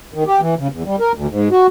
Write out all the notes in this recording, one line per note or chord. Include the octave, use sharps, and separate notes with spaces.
D#3
G4
E3
C#3
E2
G3
A#4
D2
G#2
F#4